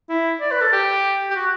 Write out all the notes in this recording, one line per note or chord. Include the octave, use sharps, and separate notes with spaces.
E4
D5
B4
A4
G4
G4
F#4